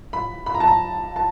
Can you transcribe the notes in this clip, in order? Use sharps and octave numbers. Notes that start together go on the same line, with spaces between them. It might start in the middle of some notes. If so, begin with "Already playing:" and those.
B5
B5
A#5
A5
A#5
A5